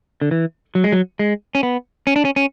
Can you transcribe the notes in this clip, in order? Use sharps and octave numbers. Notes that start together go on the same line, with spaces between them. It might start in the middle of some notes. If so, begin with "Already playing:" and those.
D3
E3
F#3
G#3
F#3
G#3
C#4
B3
C#4
D4
C#4
C#4